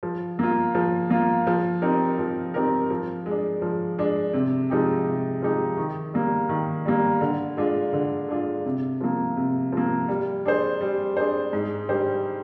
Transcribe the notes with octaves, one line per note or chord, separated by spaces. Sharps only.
F3
A#3 F4
F3
A#3 F4
F3
C4 D#4 G4 A#4
F3
C4 D#4 G4 A#4
F3
G#3 D4
F3
G#3 D4
C3
F3 G#3 D#4 G4
C3
F3 G#3 D#4 G4
D#3
G3 A#3
D#3
G3 A#3
D3
G#3 D4 F4
D3
G#3 D4 F4
C3
F3 A#3
C3
F3 A#3
G3
D4 G#4 C5
G3
D4 G#4 C5
G#2
G3 D4 G4 C5